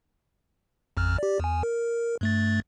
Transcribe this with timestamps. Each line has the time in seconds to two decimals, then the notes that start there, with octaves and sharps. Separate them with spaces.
0.97 A1 F2 F6
1.18 G4 D5
1.40 E2 G#5
1.63 A#4
2.21 G2 A3 A6